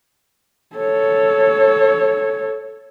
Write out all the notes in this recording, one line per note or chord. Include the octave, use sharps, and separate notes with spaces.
A4 C#5